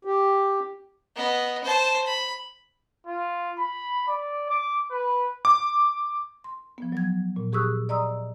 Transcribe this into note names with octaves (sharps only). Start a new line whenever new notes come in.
G4
B3 D#5
C5 A5
B5
F4
B5
D5
D6
B4
D6
C6
F3 B3
F#3 G3 G#6
A#2
G4 G#4 C#6 D#6 E6 F#6
D5 D#5 A#5 C6 D#6 E6